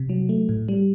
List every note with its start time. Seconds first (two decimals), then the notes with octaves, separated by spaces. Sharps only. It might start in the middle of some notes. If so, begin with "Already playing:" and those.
Already playing: C3
0.09 F#3
0.29 A3
0.49 A2
0.69 G3